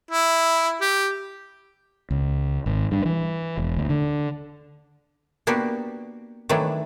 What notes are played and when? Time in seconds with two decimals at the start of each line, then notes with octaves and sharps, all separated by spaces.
0.11 E4
0.81 G4
2.11 C#2
2.66 G#1
2.92 G2
3.05 E3
3.57 E1
3.77 D2
3.90 D3
5.47 A#3 B3 D4 F#4 G4
6.49 D#3 E3 F#3 A3 D4